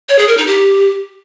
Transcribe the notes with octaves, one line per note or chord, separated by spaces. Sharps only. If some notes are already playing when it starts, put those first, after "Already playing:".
C#5
G#4
A#4
D#4
G4